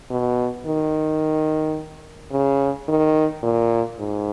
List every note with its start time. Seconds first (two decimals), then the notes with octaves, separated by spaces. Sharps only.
0.10 B2
0.67 D#3
2.32 C#3
2.88 D#3
3.43 A#2
3.99 G#2